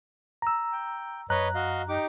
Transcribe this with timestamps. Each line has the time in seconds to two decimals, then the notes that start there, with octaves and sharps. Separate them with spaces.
0.42 A#5 E6
0.72 G5
1.30 F#2 B4 C#5 D#5 A#5 F#6
1.55 F#4 D#5 F5
1.89 D#4 G4 D6